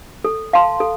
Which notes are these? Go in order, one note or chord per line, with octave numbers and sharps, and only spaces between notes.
A4
F5 A5 C6
A4